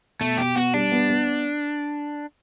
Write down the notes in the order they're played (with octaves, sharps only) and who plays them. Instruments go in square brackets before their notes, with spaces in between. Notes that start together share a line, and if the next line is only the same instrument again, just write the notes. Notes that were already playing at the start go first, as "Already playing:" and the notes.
[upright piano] B2 [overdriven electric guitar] A3
[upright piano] B2 [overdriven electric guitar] G4
[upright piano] B3 [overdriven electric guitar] F#4
[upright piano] G3 [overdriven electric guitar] D4
[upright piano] B3
B3